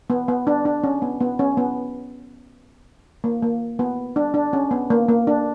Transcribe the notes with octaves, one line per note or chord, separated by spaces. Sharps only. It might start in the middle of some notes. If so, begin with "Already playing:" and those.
B3
B3
D4
D4
C#4
B3
B3
C#4
B3
A#3
A#3
B3
D4
D4
C#4
B3
A#3
A#3
D4